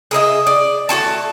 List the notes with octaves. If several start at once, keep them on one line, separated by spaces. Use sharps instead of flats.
G#4 A#4 D#5 E5
D5
A3 F#4 G#5 A5